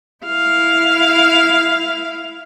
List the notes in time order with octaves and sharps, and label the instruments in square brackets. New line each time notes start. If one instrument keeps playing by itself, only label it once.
[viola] E4 F5